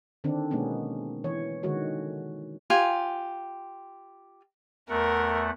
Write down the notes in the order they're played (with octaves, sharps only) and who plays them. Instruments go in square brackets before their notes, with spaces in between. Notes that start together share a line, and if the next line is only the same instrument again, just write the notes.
[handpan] D3 D#3 C4 D4
B2 G#3 A#3 B3 C#4
E3 C#5
D3 D#3 G#3 F#4 C#5
[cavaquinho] F4 G4 G#5
[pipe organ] E2 A3 F#5 [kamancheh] A#4